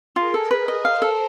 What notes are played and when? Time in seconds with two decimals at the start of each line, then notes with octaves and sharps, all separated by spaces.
0.16 F4 G#4 A#4
0.34 A4
0.51 B4
0.68 D#5
0.85 A#4 C5 F5
1.02 A4